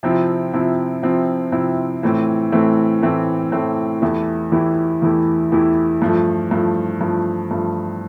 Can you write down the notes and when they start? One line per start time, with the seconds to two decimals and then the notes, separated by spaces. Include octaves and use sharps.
0.03 C3 F3 C4 E4
0.53 C3 F3 C4 E4
1.03 C3 F3 C4 E4
1.52 C3 F3 C4 E4
2.03 A2 E3 A3 C4
2.52 A2 E3 A3 C4
3.02 A2 E3 A3 C4
3.52 A2 E3 A3 C4
4.02 E2 E3 A3 E4 G4
4.52 E2 E3 A3 E4 G4
5.02 E2 E3 A3 E4 G4
5.52 E2 E3 A3 E4 G4
6.02 G2 F3 A3
6.51 G2 F3 A3
7.01 G2 F3 A3
7.51 G2 F3 A3